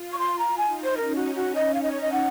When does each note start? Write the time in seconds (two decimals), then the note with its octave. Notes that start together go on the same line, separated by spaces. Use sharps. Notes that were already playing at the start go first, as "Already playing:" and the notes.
Already playing: F4
0.12 C#6
0.19 C6
0.39 A#5
0.58 D#4 G#5
0.84 C5
0.96 C#4 A#4
1.15 F#4
1.35 F#4
1.55 D#5
1.74 D#4 F5
1.82 D#5
1.91 C#5
2.01 D#5
2.12 F#5